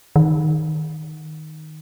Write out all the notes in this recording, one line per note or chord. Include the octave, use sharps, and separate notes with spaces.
D#3